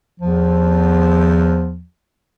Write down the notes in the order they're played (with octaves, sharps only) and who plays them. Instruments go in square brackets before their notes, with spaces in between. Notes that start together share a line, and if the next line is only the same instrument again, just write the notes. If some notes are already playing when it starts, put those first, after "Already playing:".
[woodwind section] E2 F3